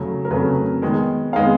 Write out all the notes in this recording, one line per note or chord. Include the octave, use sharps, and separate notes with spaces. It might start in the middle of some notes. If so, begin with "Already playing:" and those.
Already playing: C#3 F#3 A3
A#4
C#3 F#3 A3 B4
D#3 G#3 B3
D#3 G#3 B3 F5